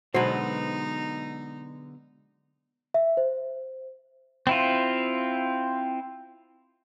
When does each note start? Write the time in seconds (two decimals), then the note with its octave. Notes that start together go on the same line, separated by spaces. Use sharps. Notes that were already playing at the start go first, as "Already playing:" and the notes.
0.14 B2 D3 F#3 G#3 D#4 B4 C5
2.94 E5
3.17 C5
4.47 C4 E4 F4